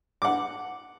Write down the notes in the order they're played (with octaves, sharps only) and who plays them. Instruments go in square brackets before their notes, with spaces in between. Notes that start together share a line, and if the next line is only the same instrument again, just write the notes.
[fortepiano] F#5 D6